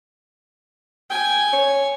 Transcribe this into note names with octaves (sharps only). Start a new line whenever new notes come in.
G5 G#5
C#5